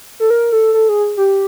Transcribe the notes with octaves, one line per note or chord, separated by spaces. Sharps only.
A4
A#4
A4
A4
G#4
G4